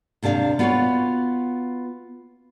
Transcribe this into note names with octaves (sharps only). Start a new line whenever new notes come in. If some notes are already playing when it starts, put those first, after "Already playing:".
D#2 C3 D4 G#4 F5
B3 F4 F#4 B4 C#5